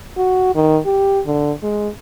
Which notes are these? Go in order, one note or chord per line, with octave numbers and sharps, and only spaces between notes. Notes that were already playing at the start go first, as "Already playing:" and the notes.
F#4
D#3
G4
D3
G#3